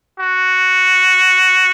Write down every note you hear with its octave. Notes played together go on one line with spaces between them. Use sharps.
F#4